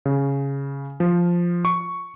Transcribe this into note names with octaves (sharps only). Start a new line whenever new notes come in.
C#3
F3
C#6